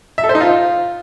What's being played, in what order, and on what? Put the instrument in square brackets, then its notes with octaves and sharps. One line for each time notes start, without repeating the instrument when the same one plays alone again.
[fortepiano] E5
A4
C5
D#4
F4